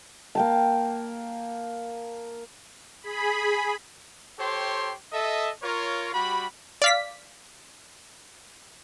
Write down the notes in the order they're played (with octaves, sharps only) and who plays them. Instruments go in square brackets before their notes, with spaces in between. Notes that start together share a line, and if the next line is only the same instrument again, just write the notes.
[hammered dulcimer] A#3 G5 A5
[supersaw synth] G#4 B5
[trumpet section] G4 A4 C5 C#5 G5 C6
A4 D#5 E5
F4 A#4 C#5
G3 F#4 G4 B5
[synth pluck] D5 F5 B6